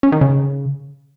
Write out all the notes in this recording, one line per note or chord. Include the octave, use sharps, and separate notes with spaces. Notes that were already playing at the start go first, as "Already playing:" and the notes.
C#4
D#3
C#3